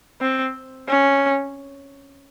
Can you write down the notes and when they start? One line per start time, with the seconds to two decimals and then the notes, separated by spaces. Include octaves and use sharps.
0.21 C4
0.88 C#4